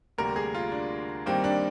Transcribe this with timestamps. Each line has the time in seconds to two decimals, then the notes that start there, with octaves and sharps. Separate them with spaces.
0.18 D2 C3 G3 A#3 A#4
0.36 G#4
0.54 F4
0.72 D4
1.26 G2 D#3 G3 A#3 C4
1.44 D4